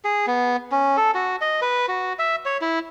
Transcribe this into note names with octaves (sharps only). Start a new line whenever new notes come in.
G#4
B3
C#4
A4
F#4
D#5
B4
F#4
E5
C#5
E4